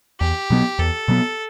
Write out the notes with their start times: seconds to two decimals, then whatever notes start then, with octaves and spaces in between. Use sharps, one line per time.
0.20 E2 G4
0.50 B2 F#3 B3
0.79 E2 A4
1.08 B2 F#3 B3